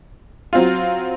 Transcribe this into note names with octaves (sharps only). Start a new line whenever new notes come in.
F#3 C4 F4